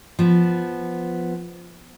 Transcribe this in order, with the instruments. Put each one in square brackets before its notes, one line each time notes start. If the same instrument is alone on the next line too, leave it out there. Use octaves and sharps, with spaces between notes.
[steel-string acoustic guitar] F3 B3